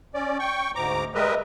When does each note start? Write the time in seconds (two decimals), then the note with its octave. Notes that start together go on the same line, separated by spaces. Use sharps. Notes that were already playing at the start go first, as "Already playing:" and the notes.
0.14 C#4 D5
0.39 G5 C#6
0.75 D2 G#2 A#5 D6
1.15 G3 G#3 A#4 B4 D#5 E5